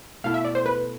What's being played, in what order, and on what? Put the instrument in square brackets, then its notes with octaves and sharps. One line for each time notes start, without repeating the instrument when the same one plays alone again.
[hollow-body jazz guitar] B2 A3 E4 A4 [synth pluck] F5
[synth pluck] E5
D5
C5
B4